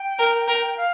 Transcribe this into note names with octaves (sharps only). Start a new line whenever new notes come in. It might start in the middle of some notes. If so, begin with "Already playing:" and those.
Already playing: G5
A#4
A#4
F5